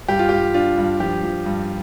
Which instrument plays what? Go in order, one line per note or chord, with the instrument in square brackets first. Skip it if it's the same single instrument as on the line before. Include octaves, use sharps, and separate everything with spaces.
[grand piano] G2 G4
F4
G2 G4
D4 F4
G2
F3 G4
F3
G2